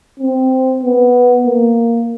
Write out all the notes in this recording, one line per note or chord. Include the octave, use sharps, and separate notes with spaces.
C4
B3
A#3